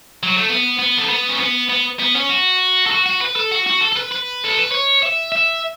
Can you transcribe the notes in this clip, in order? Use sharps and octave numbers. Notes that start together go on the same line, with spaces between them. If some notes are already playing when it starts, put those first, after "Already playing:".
F#3
A3
B3
B3
A3
B3
C#4
B3
B3
B3
C#4
F#4
A4
F#4
F#4
B4
A4
F#4
F#4
A4
A4
B4
B4
A4
B4
C#5
E5
E5